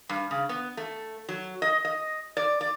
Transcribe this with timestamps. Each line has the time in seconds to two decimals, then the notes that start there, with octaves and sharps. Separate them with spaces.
0.09 G2
0.31 C#3
0.49 B3
0.77 A3
1.29 F#3
1.62 D#5
1.85 D#5
2.37 D5
2.61 D5